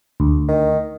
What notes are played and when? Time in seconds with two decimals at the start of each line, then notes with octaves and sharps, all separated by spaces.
0.20 D2
0.48 D#3